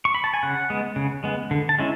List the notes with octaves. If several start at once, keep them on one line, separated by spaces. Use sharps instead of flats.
C#6
B5
A5
G#5
C#3 F#5
G#3 B3
C#3
G#3 B3
D3
A5
G#3 C#4 E4